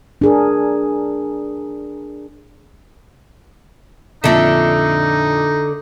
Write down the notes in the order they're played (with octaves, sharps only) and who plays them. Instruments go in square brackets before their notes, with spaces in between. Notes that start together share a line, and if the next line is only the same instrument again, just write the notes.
[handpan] D4 G#4 A#4
[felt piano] F2 A#2 [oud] D3 D4 [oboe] D#4 [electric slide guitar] E5